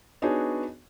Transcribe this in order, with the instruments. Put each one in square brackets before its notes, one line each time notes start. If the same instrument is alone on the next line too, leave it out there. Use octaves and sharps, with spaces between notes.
[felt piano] B3 D4 D#4 F#4 G#4 C#5